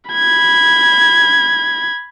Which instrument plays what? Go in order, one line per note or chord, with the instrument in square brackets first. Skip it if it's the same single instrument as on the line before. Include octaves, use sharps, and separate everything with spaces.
[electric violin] B5 G#6